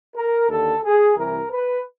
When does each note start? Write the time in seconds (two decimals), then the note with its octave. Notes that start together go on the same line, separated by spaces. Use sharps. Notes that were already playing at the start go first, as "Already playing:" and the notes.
0.15 A#4
0.49 D#2 D3 A4
0.83 G#4
1.16 C2 C3 E3 A#4
1.50 B4